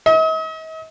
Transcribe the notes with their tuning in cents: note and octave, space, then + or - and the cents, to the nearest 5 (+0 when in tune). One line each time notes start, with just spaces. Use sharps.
D#5 +45